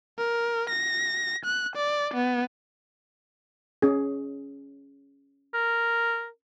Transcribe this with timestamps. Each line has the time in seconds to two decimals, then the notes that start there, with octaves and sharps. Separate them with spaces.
0.18 A#4
0.69 A#6
1.45 F#6
1.76 D5
2.14 B3
3.82 C#4 G#4
5.54 A#4